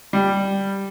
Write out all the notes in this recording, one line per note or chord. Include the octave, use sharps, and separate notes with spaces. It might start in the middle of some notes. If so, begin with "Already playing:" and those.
G3